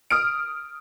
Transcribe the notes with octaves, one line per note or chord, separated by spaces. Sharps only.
D#6 F6 D7